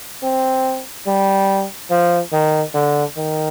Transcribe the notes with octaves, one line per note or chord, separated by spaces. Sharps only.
C4
G3
F3
D#3
D3
D#3